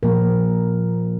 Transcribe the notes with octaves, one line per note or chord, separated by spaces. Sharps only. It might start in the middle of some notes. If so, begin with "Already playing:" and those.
A#2 F3 A#3 A#4